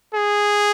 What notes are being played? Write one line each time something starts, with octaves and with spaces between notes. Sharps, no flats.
G#4